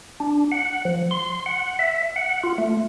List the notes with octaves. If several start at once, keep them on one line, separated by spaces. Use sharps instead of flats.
D4
F#5
F3
C6
F#5
E5
F#5
F4
A3